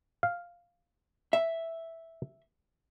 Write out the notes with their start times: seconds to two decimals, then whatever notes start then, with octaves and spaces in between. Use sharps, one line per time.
0.23 F5
1.33 E5